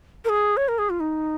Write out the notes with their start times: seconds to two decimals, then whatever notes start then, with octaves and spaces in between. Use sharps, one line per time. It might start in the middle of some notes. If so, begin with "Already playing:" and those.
0.25 A#4
0.29 G#4
0.57 C#5
0.68 A#4
0.79 G#4
0.90 F4
1.00 D#4